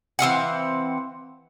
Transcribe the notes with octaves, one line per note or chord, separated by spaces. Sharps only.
E3 C4 F5 F#5